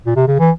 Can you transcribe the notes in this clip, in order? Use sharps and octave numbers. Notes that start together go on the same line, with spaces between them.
A#2
C3
C#3
E3